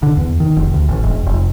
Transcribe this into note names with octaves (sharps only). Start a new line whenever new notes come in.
D3
E2
D#3
F1
D2
A1
E1
F1